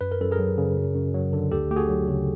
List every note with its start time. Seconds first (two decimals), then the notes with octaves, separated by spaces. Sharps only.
0.01 F#2 B4
0.12 A#4
0.20 F#2 A4
0.31 G#4 A#4
0.39 F#3
0.58 C#3
0.76 F#2
0.95 F#2
1.14 F#3
1.33 D3
1.51 D2 G4 A4
1.70 D2 G4
1.76 F#4 G#4
1.89 F#3
2.08 C#3